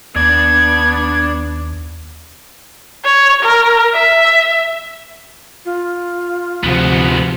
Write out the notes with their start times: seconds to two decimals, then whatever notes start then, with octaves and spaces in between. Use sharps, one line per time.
0.16 D#2 B3 D4 D5 G#6
3.05 C#5
3.43 A#4
3.94 E5
5.65 F4
6.64 D2 G#2 C3 F3 B3